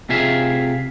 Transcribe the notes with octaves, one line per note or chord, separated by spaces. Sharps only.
C3 F4 G#4 E5 F5